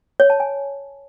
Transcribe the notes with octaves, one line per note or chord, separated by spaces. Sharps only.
C#5
A5
G#5